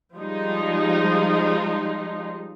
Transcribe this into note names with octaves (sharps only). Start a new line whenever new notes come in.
F3 G3 G#3 D#4